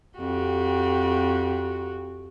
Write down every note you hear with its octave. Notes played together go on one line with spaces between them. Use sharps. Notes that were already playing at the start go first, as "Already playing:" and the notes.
F2 F#4 G4